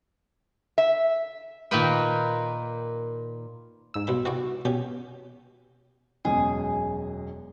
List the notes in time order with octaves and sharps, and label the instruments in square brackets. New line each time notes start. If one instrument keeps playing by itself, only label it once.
[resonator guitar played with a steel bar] E5
[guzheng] A#2 D#3 A#3 F4 B4 G5
[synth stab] G#2 E6
[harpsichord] B1 B2 B5
[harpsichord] C3 E3 D5 [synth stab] F#4
[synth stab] B2 [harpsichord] C#4 G4
[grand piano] E1 F#2 B2 [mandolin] G#4